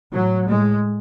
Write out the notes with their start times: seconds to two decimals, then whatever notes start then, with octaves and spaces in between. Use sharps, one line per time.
0.13 A2 F#3
0.50 A2 G#3